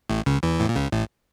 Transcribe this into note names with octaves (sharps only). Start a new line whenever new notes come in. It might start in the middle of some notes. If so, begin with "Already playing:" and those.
A1 A2
C#2 C#3
E2 E3
A2
A#2
C#2 C#3
A1 A2